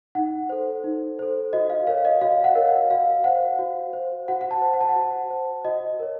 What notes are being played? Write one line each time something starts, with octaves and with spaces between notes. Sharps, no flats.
D#4 F#5
A4 C5
D#4
A4 C5
F#4 D#5
F5
A#4 C#5 F5
D#5
F#4 F5
F#5
A#4 C#5
F5
F#4 F5
C5 F#5
F#4
C5
F#4 F#5
F#5
A5
C5
F#5
A5
F#5
F#4
C5
F#4 D#5
A#4 C#5